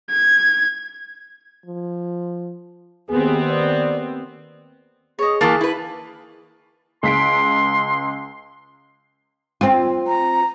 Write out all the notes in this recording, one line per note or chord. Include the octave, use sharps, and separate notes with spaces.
G#6
F3
D#2 B3 C4 G#4
D5
G#4 C#5 D#5
E3 A#3 A5
E4 B4
C#2 C6 B6 D7
C4 F4
A#5